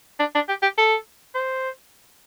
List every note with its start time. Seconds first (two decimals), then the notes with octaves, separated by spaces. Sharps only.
0.19 D4
0.35 D4
0.49 G4
0.62 G4
0.78 A4
1.35 C5